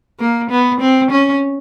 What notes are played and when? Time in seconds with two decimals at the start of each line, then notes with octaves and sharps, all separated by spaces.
0.20 A#3
0.51 B3
0.81 C4
1.11 C#4